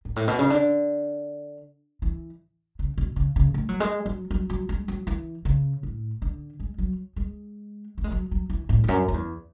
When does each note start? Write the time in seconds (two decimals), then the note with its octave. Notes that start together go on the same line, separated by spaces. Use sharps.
0.05 G#2
0.16 A2
0.28 B2
0.39 C#3
0.50 D3
2.02 E3
2.79 C#3
2.98 B2
3.16 C#3
3.36 C#3
3.54 A3
3.69 F#3
3.80 G#3
4.06 F#3
4.31 F#3
4.50 F#3
4.69 G#3
4.88 F#3
5.07 E3
5.45 C#3
5.83 A2
6.22 D3
6.60 G#3
6.78 F#3
7.16 G#3
7.98 A3
8.04 G#3
8.12 F#3
8.31 F#3
8.50 E3
8.69 A2
8.84 E2
8.88 F#2
9.08 F#2
9.14 E2